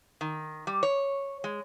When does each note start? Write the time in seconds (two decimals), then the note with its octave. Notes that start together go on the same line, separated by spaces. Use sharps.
0.21 D#3
0.67 G3
0.83 C#5
1.44 G#3